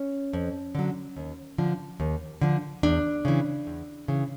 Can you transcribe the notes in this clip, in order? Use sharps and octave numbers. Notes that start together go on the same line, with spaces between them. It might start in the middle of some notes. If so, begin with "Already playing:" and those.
Already playing: C#4
F2
D3 F#3
D#2
D3 F3
D#2
D3 F3
E2 D4
C#3 E3
E2
C#3 E3